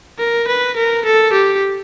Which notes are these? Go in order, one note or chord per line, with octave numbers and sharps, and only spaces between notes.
A#4
B4
A#4
A4
G4